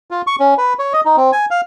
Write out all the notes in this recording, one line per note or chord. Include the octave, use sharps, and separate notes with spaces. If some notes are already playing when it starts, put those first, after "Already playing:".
F4
C#6
C#4
B4
C#5
D#5
D#4
C4
G#5
F5